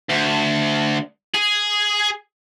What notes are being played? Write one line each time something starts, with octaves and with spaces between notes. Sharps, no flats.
D2
G#4